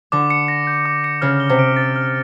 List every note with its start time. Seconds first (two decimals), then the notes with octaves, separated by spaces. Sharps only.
0.12 D3 D6
0.30 C#7
0.48 A#6
0.67 G6
0.86 D6
1.04 C#7
1.22 C#3 F6
1.40 G7
1.50 C3
1.59 D7
1.76 A6
1.96 F6